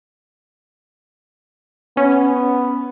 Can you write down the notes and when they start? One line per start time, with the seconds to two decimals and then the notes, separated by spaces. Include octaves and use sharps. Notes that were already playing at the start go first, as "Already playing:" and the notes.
1.97 B3 C#4